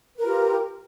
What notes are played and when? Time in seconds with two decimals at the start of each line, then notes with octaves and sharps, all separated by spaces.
0.15 B4
0.19 A#4
0.22 F4
0.26 G4